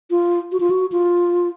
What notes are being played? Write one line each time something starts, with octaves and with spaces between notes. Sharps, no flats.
F4
F#4
F4
F#4
F4